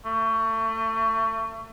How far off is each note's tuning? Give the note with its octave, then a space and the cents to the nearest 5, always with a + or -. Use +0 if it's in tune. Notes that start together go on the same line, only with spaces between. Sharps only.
A3 +30